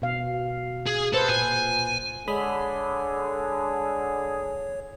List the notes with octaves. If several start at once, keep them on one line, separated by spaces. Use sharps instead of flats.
B2 F5
G#4
A4 B4 C5
A#2 G#5
D3 G#3 G#4 C#5 B5 D#6